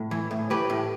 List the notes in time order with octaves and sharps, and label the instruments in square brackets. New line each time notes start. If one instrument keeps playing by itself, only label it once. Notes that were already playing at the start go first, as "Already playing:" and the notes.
Already playing: [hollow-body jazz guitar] A2
E3
A2
A2 G4 B4
A2